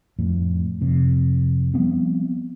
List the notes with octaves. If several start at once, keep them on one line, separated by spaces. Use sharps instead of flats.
F2 A2
F2 C3
F3 G3 B3 C4